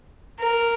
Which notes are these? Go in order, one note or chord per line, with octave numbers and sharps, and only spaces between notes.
A#4